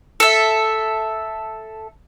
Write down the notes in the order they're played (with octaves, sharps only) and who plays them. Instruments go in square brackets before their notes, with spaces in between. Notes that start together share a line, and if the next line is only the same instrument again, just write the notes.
[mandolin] A4 E5